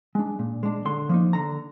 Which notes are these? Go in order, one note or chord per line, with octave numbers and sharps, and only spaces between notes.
G#3 D4
A#2
G#3 D4
D3 C6
F3 A#3 D#4
D3 A#5